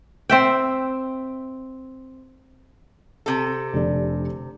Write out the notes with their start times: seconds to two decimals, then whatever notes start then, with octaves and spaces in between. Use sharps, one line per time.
0.30 C4 E5 G5
3.26 C3 A4
3.73 F1 D3 D5